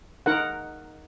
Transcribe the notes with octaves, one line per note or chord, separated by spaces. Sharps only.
D#4 A#4 F#5